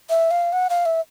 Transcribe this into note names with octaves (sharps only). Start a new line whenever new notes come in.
E5
F5
F#5
F5
E5